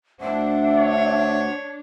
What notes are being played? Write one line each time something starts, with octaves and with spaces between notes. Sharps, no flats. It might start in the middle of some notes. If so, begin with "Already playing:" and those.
D2 D4 C5 E5 F#5
C#5